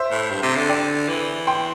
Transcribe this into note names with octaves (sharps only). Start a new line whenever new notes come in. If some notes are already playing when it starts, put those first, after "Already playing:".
Already playing: C5 E5
A2
G2
C3
D3
D5 G5
E3
G5 C6